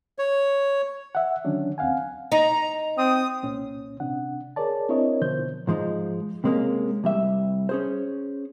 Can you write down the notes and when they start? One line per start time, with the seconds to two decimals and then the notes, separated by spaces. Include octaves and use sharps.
0.19 C#5
1.15 E5 F#5
1.45 D3 D#3 F#3 C#4 D4
1.78 D#2 C4 F5 F#5 G#5
2.32 D#4 A#5
2.98 C4 D#6
3.43 C2 A#2 C#4
4.00 C3 D4 F#5
4.56 G#4 A#4 C#5 D5 A5
4.89 C4 D4 E4 A#4 C#5 D#5
5.21 B2 D3 F3 C5 G6
5.67 G#2 F3 G#3 D#4
6.44 C3 G#3 A#3 C#4
7.04 C2 G3 E5
7.69 C#4 G#4 C5